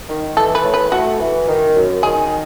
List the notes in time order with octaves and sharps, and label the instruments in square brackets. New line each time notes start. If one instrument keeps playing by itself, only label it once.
[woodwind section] D#3
[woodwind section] E3 [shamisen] A4
[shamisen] B4
[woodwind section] A2
[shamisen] B4
[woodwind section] A3 [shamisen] F#4
[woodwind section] E3
D#3
F#2
[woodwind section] D#3 [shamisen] G#4